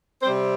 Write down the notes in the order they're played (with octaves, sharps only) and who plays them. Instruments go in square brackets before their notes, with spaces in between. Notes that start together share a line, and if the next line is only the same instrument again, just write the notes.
[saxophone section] C3 G3 C4 C5